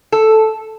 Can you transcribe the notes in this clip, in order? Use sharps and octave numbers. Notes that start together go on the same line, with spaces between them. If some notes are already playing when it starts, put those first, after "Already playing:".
A4